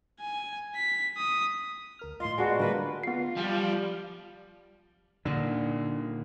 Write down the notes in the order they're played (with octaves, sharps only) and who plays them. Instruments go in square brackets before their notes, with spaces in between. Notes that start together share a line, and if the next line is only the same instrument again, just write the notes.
[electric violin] G#5
B6
D#6
[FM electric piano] D2 A#4 F6
[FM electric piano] A2 D#5 [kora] F4 [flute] C6
[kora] G#3 B3 D4 [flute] F#4
[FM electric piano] D3 G3 A3 [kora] A#3 F4 [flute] B4
[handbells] B3 C7 [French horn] F4
[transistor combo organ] F3 [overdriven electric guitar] G3
[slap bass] A#2 D#3 [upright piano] D3